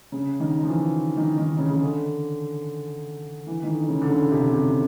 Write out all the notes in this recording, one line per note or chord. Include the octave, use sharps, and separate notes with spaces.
C#3
D#3
F3
E3
D#3
D#3
C#3
C#3
D3
E3
D#3
D3
C#3
D3
C#3
C3
C3